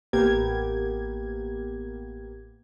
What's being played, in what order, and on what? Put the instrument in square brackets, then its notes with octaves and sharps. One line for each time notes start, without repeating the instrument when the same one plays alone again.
[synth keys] A1 A#3 B3 G4 A#4 G#6